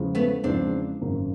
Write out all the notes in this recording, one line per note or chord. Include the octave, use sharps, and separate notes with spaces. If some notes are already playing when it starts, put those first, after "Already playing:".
Already playing: E2 C#3 F3 G#3
A3 B3
E2 C#3 F3 G#3 C4 D4
G#1 F#2 C#3 F#3 A#3